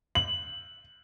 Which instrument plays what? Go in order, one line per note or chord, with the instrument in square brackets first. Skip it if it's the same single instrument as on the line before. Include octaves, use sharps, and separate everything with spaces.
[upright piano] F#7